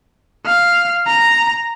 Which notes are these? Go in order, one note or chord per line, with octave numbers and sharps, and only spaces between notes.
F5
A#5